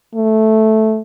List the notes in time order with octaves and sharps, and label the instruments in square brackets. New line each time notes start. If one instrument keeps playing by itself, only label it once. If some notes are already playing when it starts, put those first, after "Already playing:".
[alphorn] A3